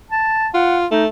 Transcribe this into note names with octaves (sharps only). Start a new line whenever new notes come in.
A5
F4 F#5
A3 D#4